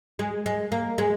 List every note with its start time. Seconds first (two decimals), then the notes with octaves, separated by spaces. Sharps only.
0.19 G#3
0.46 G#3
0.72 A#3
0.98 G#3